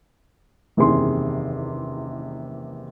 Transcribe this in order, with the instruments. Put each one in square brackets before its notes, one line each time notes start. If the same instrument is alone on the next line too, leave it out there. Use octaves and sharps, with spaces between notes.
[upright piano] F#1 E2 C3 D#3 G#4 C6